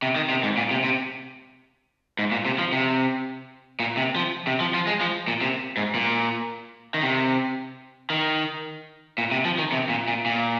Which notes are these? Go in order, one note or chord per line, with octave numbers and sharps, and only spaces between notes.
C3
D#3
C3
G#2
A#2
C3
C3
G#2
A#2
C3
F3
C3
A#2
C3
F3
C3
F3
F3
G#3
F3
A#2
C3
G#2
A#2
D#3
C3
D#3
A#2
C3
F3
D#3
C3
A#2
A#2
A#2